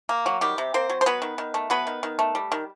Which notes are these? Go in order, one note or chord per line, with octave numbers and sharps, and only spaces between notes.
A#3
F#3
D#3 G3 G4
C3
A#3 C4 C5
F#3
C5
F#3 B3 B4
D#3
D#3
A3
F#3 B3 B4
D#3
D#3
A3
G3
D#3